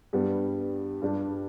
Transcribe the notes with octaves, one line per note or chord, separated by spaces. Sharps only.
G2 G3 B3
G2 G3 D4 G4